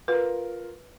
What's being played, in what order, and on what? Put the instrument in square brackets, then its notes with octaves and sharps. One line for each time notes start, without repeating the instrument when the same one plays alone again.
[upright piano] F4 A#4 [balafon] B4